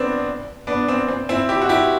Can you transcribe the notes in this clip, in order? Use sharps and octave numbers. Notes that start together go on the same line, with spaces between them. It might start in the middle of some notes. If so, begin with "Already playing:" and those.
Already playing: B3 C4 D4
B3 D4
C4
C4
C4 E4
E4 G4
F#4
E4 G4